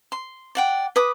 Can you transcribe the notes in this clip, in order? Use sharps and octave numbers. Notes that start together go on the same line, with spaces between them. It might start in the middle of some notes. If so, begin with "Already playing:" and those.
C6
D5 F#5 G5
B4 D6 D#6